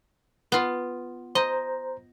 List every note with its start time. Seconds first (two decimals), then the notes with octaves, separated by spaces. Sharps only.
0.52 B3 F4
1.35 C5 D#5 A#5 G6